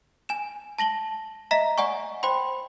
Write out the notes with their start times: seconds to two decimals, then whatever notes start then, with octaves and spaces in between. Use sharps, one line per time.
0.29 G#5 E7
0.79 A5 A#6 F#7 G7
1.51 D#5 E5 A#5 B6
1.78 D5 F#5 G#5 C#6
2.23 C5 G5 B5 C6